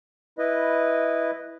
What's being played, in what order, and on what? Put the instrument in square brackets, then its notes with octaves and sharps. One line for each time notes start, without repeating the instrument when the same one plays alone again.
[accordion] E4 B4 D#5